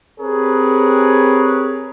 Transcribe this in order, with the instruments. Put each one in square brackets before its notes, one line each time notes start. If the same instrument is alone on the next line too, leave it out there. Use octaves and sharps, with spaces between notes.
[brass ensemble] C4 G4 G#4 A#4 B4 C#5